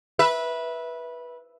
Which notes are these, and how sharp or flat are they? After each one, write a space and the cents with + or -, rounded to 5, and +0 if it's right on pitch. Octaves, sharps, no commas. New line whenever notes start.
B4 -15 E5 -5